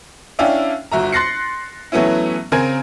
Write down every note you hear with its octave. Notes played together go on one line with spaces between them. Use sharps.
C#4 D4 E4 E5 F5 G5
G1 F#4 E5 A#5
C6 F#6 A6 A#6 C7 C#7
E3 F#3 A3 B3 C#4 E4
C#3 C4 A#4 G#5 G#6